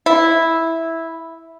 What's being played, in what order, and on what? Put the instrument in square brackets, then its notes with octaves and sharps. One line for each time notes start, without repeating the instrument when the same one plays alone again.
[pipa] E4